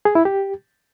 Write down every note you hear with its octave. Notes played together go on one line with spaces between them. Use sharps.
G#4
E4
G4